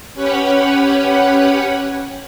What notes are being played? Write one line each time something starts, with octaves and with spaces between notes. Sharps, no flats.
C#4 G4 B4 C#5 F#5 B5